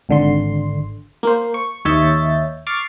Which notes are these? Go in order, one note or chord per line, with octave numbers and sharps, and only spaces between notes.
G#1 D3 C6
A#3 C5
C#6
D#2 C#5 D#5 E5 G6 A6
C#6 D6 F6 A6 C7 C#7